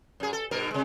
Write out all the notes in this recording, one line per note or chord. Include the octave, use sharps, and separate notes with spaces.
F#2 G#4
A4
G2 B2 A#4
C3 G#3